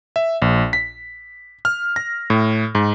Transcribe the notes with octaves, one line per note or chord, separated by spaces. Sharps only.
E5
A#1
B6
F6
A#6
A2
G#2